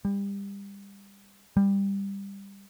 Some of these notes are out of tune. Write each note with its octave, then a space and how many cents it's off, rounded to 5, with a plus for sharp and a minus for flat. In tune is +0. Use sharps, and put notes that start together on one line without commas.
G3 +30
G3 +15